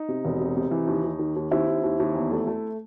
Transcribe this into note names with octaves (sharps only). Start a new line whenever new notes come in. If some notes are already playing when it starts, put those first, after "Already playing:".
Already playing: D#4
C3
E1
C3
C3
E3
D#2
D#2
D#3
D#2
D#2 C4 E4
D#2
D#2
D#2
E2
A3
A3